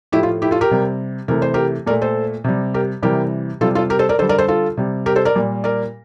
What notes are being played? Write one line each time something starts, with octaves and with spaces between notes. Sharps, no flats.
A2 F3 A3 E4 G4
F4
E4 G4
F4 A4
G4 A#4
C3 G3
C3 E3 A3 A#4
C5
G4 A#4
A#2 A3 A#4 D5
A4 C5
C3 G3
G4 A#4
C3 E3 G3 G4 A#4
C3 G3 F4 A4
F4 A4
G4 A#4
A4 C5
A#4 D5
D3 G3 A4 C5
A#4 D5
A4 C5
F4 A4
C3 G3
G4 A#4
A4 C5
A#4 D5
A#2 G3
A#4 D5